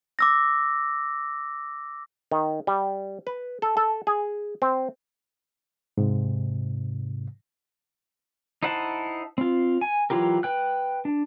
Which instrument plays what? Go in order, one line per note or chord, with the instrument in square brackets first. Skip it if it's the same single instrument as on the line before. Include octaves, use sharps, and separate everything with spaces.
[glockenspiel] D6 E6 A#6
[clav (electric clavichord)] D#3
G3
B4
A4
A4
G#4
C4
[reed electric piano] G#2 C3
[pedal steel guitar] D#4 E4 C5 F#5 A5
C4 F4
G#5
E3 F#3 F4 G4 A#4
B4 G5 F#6
D4